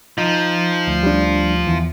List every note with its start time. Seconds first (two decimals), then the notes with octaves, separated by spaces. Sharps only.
0.18 F3 D#4
0.87 D2
1.03 G3 D4
1.67 E2 E3